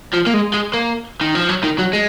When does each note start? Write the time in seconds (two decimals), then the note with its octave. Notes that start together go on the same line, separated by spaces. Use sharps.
0.14 F3
0.27 A#3
0.34 G#3
0.54 G#3
0.74 A#3
1.21 D#3
1.35 F3
1.49 F#3
1.63 D#3
1.79 F#3
1.93 G#3